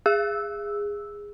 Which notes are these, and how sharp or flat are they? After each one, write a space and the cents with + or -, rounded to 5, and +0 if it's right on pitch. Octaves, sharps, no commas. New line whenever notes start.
G#4 -15 E6 -5